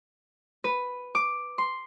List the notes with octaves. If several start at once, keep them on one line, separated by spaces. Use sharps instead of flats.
B4
D6
C6